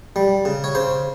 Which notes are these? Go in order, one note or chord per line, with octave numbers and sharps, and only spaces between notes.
G3
C#3
C#5
C#3 C5